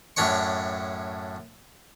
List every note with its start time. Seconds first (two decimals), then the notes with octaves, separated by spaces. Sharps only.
0.17 F#2 A2 D4 C#5 C#6